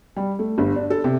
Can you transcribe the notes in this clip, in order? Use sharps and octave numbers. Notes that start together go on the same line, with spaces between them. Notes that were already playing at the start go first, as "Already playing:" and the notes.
G3
A3
G1
D4
A4
C3